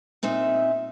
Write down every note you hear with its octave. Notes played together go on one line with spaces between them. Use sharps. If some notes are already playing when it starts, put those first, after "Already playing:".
A#2 C4 D#4 E5